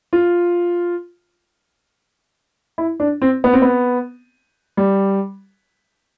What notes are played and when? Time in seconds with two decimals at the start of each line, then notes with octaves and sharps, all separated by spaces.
0.13 F4
2.78 E4
3.00 D4
3.22 C4
3.44 B3
3.53 C4
3.62 B3
4.77 G3